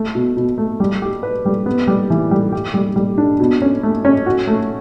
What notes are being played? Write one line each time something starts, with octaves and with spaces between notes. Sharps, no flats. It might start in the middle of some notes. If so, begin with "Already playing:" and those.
Already playing: A3
B2
B2
A3
G3
G4
B4
G3
B3
G3
E3
G3
G4
G3
G3
D4
B2
C#4
A3
C#4
F#4
A3